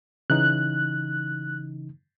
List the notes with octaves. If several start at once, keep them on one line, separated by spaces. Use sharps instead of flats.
C#3 E3 D#4 F#6